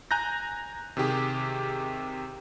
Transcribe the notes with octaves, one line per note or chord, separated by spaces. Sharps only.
G#5 A#5 F#6 G6 A#6
C3 D#3 G4 G#4